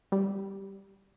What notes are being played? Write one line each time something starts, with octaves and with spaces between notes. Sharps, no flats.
G3